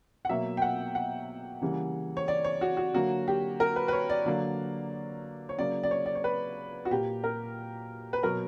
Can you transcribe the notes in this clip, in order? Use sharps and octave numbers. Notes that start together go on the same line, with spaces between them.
F#5
B2 F#3 A#3 E5
G5
F#5
F#5
C#3 E3 G3 A#3
C#5
D5
C#5
F#4
F#4
D3 F#3 A#3 F#4
G4
A#4
B4
B4
C#5
D5
D3 F#3 A#3
C#5
C#3 F#3 A#3 D5
D5
C#5
D5
C#5
B4
F#4
A#2 A#3 G4
A#4
B4
B2 F#3 B3 A#4